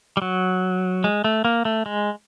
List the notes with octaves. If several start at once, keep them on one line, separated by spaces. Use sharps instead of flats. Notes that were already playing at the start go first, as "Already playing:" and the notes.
G3
F#3
G#3
A3
A#3
A3
G#3